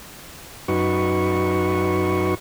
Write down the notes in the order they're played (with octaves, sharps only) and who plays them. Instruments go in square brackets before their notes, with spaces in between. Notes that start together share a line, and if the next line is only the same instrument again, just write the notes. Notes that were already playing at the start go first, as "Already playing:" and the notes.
[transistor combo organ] F#2 D#4 F#4 B4 C#6